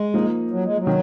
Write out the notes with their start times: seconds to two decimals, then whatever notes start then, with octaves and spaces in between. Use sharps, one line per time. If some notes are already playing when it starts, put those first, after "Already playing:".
Already playing: G#3
0.14 F3 A#3 D#4
0.51 F#3
0.64 G#3
0.78 F#3
0.87 D#3